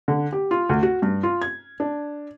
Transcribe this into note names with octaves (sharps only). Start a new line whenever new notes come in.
D3
G4
F4
D2
F#4
G2
F4
G#6
D4